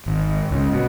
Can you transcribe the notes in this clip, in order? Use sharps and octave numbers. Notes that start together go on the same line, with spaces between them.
G#1
C#2
B2